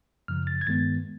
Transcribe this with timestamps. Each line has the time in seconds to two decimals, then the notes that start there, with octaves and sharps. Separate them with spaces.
0.28 F#2 C#3 F3 F6
0.47 A6
0.61 G#6
0.67 G2 D#3 G#3 B3 A6